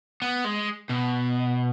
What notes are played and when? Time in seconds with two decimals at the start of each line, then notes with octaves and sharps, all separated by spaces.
0.22 B3
0.45 G#3
0.89 B2